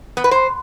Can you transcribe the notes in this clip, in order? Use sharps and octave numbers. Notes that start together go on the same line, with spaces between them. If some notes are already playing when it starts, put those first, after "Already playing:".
B3
B4
C5